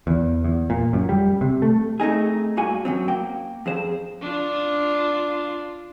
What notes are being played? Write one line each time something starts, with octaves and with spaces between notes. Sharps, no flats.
E2
E2
A#2
F#2
G3
C3
A3
A3 C4 D#4 G#4
G2 A#3 F#4 G#5
F#2 F#3 C4
A#3 G5
F2 G#4 C5
D4 F4